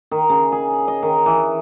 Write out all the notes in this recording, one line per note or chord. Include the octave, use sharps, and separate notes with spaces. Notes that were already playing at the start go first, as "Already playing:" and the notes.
D#3
C#3
G#4
D#5
D#3
E3